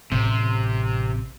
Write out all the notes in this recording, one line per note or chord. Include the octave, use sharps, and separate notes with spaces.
A1 C3